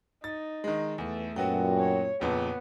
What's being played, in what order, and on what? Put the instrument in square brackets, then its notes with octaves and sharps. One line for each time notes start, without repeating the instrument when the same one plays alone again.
[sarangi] D#4 [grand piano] A6
[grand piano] D#3 G#3
[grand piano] E2 [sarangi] A3 [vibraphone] A4 B4
[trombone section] F#2 A#2 [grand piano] F#3 B3 F#4 [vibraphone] G5 G#5
[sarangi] C#5
[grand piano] F2 A#2 C#3 [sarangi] B3 [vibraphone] B4 A5